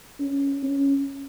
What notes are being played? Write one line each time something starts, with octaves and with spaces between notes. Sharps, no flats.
C#4
C#4